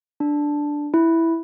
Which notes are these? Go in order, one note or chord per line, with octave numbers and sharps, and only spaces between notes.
D4
E4